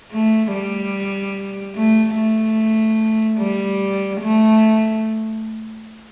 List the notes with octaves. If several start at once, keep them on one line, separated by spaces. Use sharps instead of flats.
A3
G3
A3
A3
G3
A3